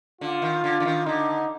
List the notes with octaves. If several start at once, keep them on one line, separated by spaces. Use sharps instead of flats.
D3 F4
D#3
D3
D3
D#3
D3 D#4